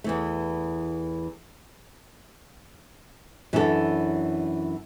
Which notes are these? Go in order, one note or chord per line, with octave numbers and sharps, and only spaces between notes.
E2 E3 A3
F#2 E3 D4 F#4 A4